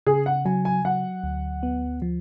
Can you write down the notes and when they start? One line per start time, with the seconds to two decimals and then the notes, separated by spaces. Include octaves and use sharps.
0.07 C#3 G#4
0.26 F#5
0.45 F#3 G#5
0.65 G#5
0.85 F#3 F#5
1.24 D2
1.63 B3
2.02 F3